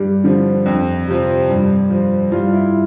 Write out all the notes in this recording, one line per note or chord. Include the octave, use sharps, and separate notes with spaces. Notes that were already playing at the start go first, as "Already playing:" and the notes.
Already playing: G2 G4
D3 F3
F2
C3 F3
G2
F3
G2 F4
E4